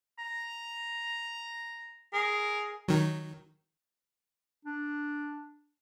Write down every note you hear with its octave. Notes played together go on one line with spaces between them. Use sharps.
A#5
G#4 A#4
D#3 F#3
D4